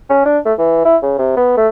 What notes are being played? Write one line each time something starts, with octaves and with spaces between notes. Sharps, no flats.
C#4
D4
A3
E3
E4
C#3
C3
B3
A3